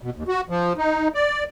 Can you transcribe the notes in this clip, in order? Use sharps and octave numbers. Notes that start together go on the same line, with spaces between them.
B2
D#2
F#4
F3
D#4
D5